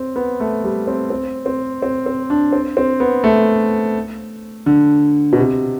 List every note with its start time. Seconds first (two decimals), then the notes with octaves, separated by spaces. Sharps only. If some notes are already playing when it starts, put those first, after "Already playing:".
Already playing: C4
0.16 B3
0.40 A3
0.64 G3
0.88 C4
1.10 C4
1.46 C4
1.82 C4
2.06 C4
2.30 D4
2.53 C4
2.77 C4
3.00 B3
3.24 A3
4.66 D3
5.33 B2
5.37 C3